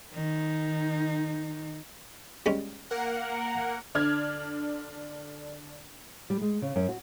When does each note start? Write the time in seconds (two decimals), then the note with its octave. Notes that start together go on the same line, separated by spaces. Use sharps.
0.13 D#3 D#4
2.46 G3 G#3 C#4
2.91 A#3 A#4 F#5
3.95 D3 D4 F6 G#6
6.30 G3
6.41 G#3
6.62 C#3
6.76 F#2
6.89 F#4